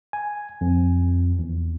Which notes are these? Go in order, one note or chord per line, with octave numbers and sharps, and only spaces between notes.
G#5
F2
E2